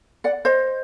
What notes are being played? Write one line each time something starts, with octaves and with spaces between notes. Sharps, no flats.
D5 F#5
C5 D#5